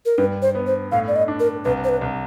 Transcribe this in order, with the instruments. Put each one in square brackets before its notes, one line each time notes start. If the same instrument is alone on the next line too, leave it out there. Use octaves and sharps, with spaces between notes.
[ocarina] A#4
[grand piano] G2 [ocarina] B4
[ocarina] C5
[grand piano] B3
[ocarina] C5
[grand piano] A2 [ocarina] F5
[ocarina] D5
D#5
[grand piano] D4
[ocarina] A#4
[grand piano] C2 [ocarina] B4
[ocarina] C5
B4
[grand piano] C2